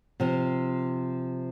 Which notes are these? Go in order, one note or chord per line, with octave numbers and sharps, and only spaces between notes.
C3 F3